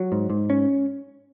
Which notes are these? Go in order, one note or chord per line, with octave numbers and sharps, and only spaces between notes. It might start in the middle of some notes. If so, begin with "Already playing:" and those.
Already playing: F#3
G#2
G#2
C#4